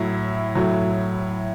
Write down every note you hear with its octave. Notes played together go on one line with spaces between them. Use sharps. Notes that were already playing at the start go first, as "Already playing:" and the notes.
Already playing: A2 F#3 E4
A2 F#3